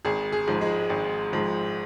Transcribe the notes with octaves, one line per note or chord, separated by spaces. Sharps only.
G#1 G#4
G#4
G#2 F3
G#3
G#1
G#2 F3